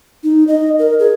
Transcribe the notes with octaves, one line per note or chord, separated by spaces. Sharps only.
D#4
D#5
A#4
G#4